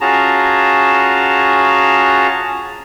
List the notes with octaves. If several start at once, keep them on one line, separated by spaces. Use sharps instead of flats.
C#4 F4 F#4 G#4 A5 A#5